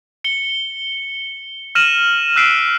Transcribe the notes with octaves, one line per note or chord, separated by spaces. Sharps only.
C#7 G7
F6 A#6 D#7 E7 F#7
E6 F#6 B6 C7 D7